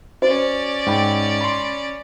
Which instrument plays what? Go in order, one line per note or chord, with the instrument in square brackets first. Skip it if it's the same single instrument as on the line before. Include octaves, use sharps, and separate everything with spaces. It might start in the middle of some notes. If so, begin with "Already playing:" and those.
[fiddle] C#4 D5 [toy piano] F#4 C5 D#5
[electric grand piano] G#2 G5 B5
B5 C6